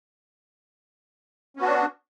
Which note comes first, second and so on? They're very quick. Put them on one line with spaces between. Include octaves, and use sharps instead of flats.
C#4 B3 F#4 D4